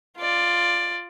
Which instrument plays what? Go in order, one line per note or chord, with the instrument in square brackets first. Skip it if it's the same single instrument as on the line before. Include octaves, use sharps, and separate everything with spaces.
[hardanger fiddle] F4 D5